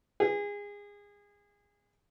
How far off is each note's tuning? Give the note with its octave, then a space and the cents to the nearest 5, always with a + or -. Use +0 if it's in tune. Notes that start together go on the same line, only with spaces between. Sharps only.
G#4 -25